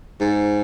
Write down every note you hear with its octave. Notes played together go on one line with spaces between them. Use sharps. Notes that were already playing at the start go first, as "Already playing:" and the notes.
G#2